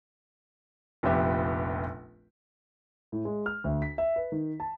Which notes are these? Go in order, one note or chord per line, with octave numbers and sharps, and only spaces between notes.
F1 A#1 F3 B3 G4 E5
A2
G#3
F6
D2
B6
E5
B4
D#3
A5